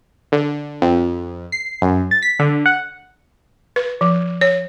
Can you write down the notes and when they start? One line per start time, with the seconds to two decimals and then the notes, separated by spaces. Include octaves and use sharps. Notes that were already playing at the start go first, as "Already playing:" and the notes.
0.32 D3
0.82 F2
1.52 C7
1.82 F#2
2.11 A6
2.22 B6
2.39 D3
2.66 F#5
3.76 B4
4.01 F3
4.41 C#5